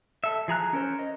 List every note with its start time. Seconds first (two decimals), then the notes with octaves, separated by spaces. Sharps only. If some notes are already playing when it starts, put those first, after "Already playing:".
0.24 A4 E5
0.48 F3 G#4 A#5 F#6
0.73 C#4 A#4 C5
0.99 D#5